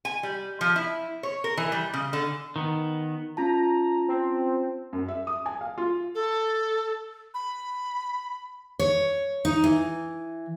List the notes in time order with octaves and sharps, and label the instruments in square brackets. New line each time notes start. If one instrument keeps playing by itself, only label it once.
[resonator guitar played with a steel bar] G#5
G3
F3
E4
C#5
A#4
E3
G3
C#3
D3
[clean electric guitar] D#3 B3
[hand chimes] C#4 F4 A5 [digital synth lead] A#5
[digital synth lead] C4
[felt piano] F#2
E5
D#6
G#5
F5
F4
[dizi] A4
B5
[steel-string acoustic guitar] C#5
D#4
E3